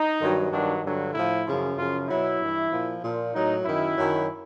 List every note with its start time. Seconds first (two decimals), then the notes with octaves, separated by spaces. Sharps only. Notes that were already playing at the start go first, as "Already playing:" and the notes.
Already playing: D#4
0.19 G2 D#3 F#3
0.51 G2 D#3 F#3 D4
0.82 G2 D3 F#3
1.13 A2 F3 E4
1.46 F#2 C#3 F3
1.76 F#2 C#3 F3 F4
2.08 B2 F#3 E4
2.40 G2 E3
2.71 A#2 F3
3.02 A#2 F3
3.33 A2 F#3 D#4
3.65 F#2 D#3 F#3 E4
3.96 F#2 D#3 F#3